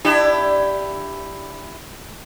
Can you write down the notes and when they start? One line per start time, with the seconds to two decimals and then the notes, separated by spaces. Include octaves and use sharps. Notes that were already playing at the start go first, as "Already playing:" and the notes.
0.05 D4 E4 G4